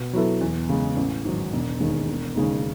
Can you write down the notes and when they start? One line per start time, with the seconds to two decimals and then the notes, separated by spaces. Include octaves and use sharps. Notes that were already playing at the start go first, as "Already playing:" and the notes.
Already playing: B2
0.13 F#3 B3 E4 A4
0.41 E2
0.69 C#3 G#3
0.97 A1
1.25 G#2 D#3 F#3
1.53 E1
1.80 D#2 D#3 G#3
2.08 E1
2.36 D#2 C#3 G#3 D#4